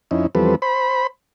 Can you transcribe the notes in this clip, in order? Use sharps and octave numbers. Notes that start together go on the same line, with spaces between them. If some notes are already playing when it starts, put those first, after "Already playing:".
F2 C#4 D#4 E4
E2 F3 G3 C4 A4 B4
C5 B5